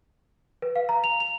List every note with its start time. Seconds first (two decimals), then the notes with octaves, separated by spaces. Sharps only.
0.62 B4
0.76 F5
0.89 A#5
1.04 F7
1.20 F7